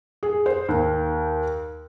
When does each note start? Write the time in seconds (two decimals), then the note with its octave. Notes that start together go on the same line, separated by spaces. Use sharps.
0.23 G#4
0.46 C5
0.68 D#2